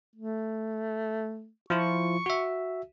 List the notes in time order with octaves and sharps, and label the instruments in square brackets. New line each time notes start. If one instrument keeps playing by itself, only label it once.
[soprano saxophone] A3
[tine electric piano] F3 E4 F4 [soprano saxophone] C#6
[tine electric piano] F#4 E5